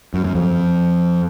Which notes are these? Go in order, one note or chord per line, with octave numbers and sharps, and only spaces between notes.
F#2
F#2
F2